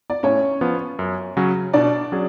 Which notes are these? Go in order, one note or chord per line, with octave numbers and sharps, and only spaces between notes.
D5
A2 C#4 C#5
F3 B3 F4
F#2
C#3 F#3 C#4
B2 D4 D5
F#3 C#4 G#4